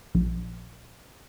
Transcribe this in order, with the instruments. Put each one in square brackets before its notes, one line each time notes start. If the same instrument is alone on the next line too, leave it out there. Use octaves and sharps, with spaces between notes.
[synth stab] A#1